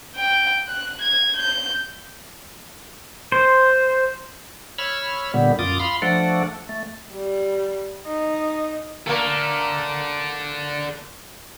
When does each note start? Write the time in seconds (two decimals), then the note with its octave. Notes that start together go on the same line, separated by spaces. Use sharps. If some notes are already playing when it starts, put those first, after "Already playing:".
0.16 G5
0.68 F#6
1.01 G#6
1.36 G6
3.32 C5
4.78 C#5 B5 E6 F6
5.34 A#2 D3 G3 B3
5.59 F#2 F4 D6 D#6
5.80 F5 B5 C6
6.02 F3 A3 D4 A4 F#5
6.69 A3
7.14 G3
8.07 D#4
9.07 A3 A#3 A4 D5